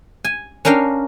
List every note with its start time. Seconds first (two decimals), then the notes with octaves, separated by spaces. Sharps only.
0.25 G#5
0.65 C#4 D4 A#4 F5 G5